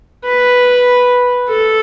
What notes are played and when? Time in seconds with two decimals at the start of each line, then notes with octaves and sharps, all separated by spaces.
0.25 B4
1.49 A4